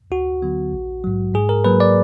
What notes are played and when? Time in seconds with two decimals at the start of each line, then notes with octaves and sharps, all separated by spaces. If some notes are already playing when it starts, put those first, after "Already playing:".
0.11 D2 F#4
0.42 D3 F#3 B3
0.73 A#1
1.04 G#2 F#3
1.34 G#2 G#4
1.49 A#4
1.65 F#3 A#3 B4
1.80 D5